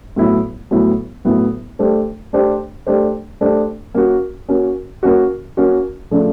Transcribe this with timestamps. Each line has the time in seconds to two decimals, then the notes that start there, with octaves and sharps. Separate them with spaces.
0.16 A2 F#3 B3 E4
0.71 A2 F#3 B3 E4
1.25 A2 F#3 B3 E4
1.79 A3 D4 G4 C5
2.33 A3 D4 G4 C5
2.87 A3 D4 G4 C5
3.41 A3 D4 G4 C5
3.94 A#3 C#4 F#4
4.48 A#3 C#4 F#4
5.03 A#3 C#4 F#4
5.57 A#3 C#4 F#4
6.11 C#3 F3 A3 D4